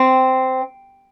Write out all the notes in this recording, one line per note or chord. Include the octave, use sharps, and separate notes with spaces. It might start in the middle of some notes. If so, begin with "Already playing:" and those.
Already playing: C4